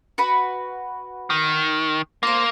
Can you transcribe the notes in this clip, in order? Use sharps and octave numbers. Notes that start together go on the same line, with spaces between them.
F#4 B4 B5
D#3
A#3 F4 C5